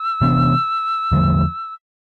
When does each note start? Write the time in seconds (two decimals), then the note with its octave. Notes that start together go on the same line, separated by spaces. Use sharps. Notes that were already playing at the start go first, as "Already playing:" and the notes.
Already playing: E6
0.21 C3 E3 B3 D4
1.12 E2 D3 F3 A3